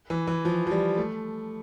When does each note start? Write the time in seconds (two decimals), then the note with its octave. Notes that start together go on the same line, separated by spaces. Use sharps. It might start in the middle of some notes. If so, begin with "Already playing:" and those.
0.10 E3
0.27 E3
0.45 F3
0.67 F3
0.71 G3
0.98 A3